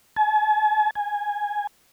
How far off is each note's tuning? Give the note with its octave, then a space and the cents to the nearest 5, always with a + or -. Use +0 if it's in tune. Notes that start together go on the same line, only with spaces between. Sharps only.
G#5 +45
G#5 -5